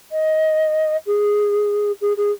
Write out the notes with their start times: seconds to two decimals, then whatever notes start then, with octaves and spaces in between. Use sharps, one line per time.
0.11 D#5
1.06 G#4
2.01 G#4
2.17 G#4